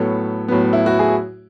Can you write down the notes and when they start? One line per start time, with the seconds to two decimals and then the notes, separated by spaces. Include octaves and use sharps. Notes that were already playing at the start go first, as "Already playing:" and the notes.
Already playing: A2 F#3 B3 A4 C#5
0.48 A2 F#3 B3
0.73 E4
0.86 F#4
0.99 G#4